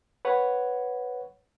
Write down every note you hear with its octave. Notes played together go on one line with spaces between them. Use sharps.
B4 C#5 F#5